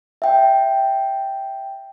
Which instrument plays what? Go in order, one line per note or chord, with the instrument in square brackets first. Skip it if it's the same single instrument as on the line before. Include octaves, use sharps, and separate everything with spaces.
[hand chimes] E5 G5